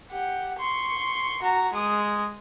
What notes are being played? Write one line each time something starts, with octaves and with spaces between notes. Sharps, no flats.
G4 F#5
C6 C#6
F#4 A#5
G#3 D#6